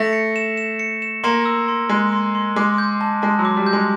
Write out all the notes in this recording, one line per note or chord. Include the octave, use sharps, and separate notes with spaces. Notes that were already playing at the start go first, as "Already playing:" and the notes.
Already playing: A3 A#6
C#7
E7
E7
C#7
E7
A#3 C6
E6
C6
G#3 C6
C6
C6
G#3 D6
G6
A5
G#3 A5
F#3
D6
G3
G6
G#3